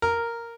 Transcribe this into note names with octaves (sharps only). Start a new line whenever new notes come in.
A#4